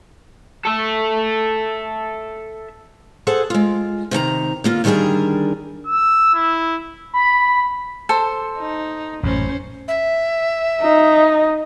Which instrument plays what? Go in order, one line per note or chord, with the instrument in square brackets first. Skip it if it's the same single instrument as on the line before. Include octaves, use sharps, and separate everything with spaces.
[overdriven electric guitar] A4 E5
[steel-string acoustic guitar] G#4 A4 C5 F#5
G#3 F4
C3 D#3 A5 A#5
D3 A#3 F4
D3 D#3 G3 D4 G#4 A#4
[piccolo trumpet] E6
E4
[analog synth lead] B5
[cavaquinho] A4 C5 C6
[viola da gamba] D#4
[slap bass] A1 F#2 A#2 [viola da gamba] C#4 C5
[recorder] E5
[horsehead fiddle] D#4